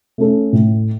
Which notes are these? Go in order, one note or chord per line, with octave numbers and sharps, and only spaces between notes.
A3 C#4 A4
A2